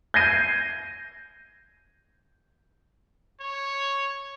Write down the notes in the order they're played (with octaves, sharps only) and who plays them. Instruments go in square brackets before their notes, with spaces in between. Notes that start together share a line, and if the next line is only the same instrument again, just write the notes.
[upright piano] G6 G#6 A#6 C7 D#7
[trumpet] C#5